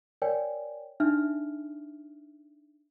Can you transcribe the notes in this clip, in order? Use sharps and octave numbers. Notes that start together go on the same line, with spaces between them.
A#4 C#5 D5 G5 G#5
D4 D#4 E5 F6